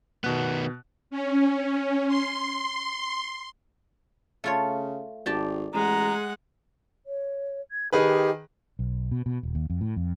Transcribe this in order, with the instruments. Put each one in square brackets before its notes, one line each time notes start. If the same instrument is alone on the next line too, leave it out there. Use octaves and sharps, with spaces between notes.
[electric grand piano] B2 F#6 [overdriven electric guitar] D#3 B3
[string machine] C#4
C6
[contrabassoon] C#3 [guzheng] A3 F4 C#5
[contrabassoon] G#1 [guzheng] G4 D5 A5
[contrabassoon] A1 [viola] G#3 F#5 [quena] A#5
[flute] C#5
G#6
[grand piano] D#3 G#4 B4 [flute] G4
[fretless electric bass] B1
B2
B2
D#1
D#2
F2
A2
F2